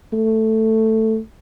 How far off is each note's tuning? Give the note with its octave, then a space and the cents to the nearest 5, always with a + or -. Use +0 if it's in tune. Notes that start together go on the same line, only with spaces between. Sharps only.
A3 +5